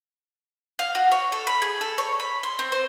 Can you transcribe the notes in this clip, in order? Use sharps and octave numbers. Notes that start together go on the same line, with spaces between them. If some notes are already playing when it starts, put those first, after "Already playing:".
F5
F#4
C#5
A4
B5
G#4
A4
C#5
B5
C6
C4
C5